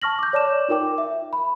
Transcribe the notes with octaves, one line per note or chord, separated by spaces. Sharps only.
A5 C#6 F6 A#6 F#7
D6 G6
C#5 D5 A5 D6 E7
D#4 F4 A#4 G5 D6
E5
B5